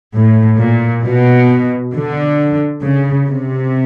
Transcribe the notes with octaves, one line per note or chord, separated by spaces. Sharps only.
A2
A#2
B2
D3
C#3
C3